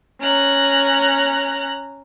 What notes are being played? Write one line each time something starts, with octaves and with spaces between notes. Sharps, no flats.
C#4 A#5 F#6